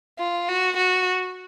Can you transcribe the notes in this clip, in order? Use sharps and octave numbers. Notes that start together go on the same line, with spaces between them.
F4
F#4
F#4